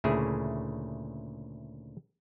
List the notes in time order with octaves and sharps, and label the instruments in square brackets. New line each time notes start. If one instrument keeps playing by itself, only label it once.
[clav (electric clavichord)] D2 A#2 C#3 A3 E4 G#4